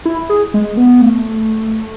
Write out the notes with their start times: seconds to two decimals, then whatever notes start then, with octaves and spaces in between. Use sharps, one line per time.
0.05 E4
0.30 G#4
0.54 G#3
0.77 B3
1.02 A3